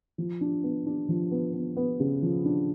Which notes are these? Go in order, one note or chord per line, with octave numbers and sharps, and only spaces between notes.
F3
D4
B3
D4
F3
B3
B3
B3
C#3
F3
D4